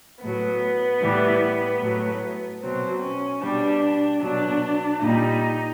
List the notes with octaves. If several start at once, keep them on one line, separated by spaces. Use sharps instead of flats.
A2 F#3 B3
A2 E3 G3
A2 F#3
B2 F#3 C4
C#4
B2 G3 D4
B2 F#3 D4
A#2 G3 D#4